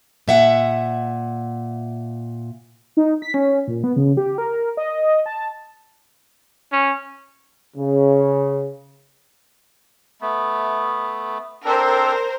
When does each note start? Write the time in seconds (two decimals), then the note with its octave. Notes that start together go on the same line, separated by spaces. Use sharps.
0.28 A#2 E5 F#5
2.97 D#4
3.22 B6
3.34 C#4
3.68 A#2
3.84 B3
3.96 C#3
4.17 G4
4.38 A#4
4.77 D#5
5.26 A5
6.72 C#4
7.76 C#3
10.21 A3 B3
11.65 C4 D4 A4 A#4 C5